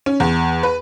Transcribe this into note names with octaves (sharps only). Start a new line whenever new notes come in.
C#4
E2
B4